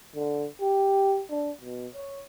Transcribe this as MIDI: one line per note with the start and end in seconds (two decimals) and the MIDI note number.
0.16 0.46 50
0.61 1.22 67
1.31 1.50 62
1.61 1.87 47
1.94 2.21 73